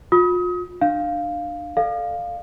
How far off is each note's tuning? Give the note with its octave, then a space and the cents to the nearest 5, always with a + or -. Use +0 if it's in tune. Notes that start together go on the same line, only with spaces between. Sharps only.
F4 +40 D#6 +30
D4 +30 F5 +0
A4 +0 D5 +45 F5 +0